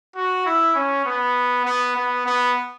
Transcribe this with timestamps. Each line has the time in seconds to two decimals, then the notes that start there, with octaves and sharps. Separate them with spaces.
0.16 F#4
0.46 E4
0.76 C#4
1.05 B3
1.66 B3
1.96 B3
2.26 B3